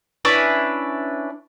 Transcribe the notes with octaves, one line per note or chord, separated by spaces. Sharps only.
C#4 D4 E4 B4